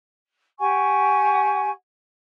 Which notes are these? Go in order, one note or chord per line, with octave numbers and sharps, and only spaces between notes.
G4 F#5 G#5 C#6